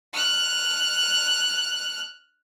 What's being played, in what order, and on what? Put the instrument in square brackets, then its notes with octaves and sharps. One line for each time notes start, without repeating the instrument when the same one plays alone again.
[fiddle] F6 F#6